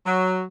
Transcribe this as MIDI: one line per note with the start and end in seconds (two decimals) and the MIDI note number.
0.06 0.42 54